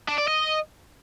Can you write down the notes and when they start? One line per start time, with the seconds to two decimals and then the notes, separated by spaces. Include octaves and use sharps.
0.08 D4
0.18 D5
0.28 D#5